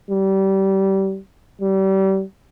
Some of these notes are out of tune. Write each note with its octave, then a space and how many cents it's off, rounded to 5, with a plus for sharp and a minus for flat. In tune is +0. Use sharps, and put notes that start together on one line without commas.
G3 -25
G3 -30